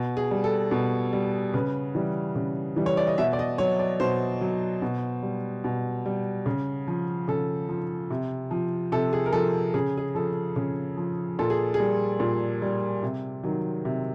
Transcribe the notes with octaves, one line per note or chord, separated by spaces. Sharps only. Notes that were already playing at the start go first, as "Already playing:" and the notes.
Already playing: B2
G#4
G3
A4
B2
G3
C#3 B4
E3 G3
C#3
E3 G3
C#5
D5
D#5
B2 E5
D5
D#5
F#3 C#5
D5
B2 C5
F#3
B2
G3
B2
G3
C#3
F3
C#3 A4
F3
C3
F3
C3 A4
G#4
A#4
F3 A4
C#3 G#4
G#4
F3 A4
C#3
F3
A#2 A4
G#4
G#4
G3
A#2
G3
C3
D#3 F#3
C3